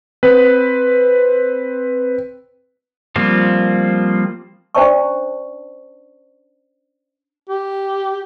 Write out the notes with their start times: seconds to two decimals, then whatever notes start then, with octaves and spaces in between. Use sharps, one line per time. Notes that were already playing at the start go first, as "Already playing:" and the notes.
0.23 C4 B4
3.16 F3 G3 A#3 C4 F4
4.75 C#4 D4 C5 D5 A5 C#6
7.49 G4